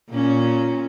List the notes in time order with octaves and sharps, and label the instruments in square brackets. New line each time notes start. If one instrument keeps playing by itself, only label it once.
[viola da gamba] A#2 C#4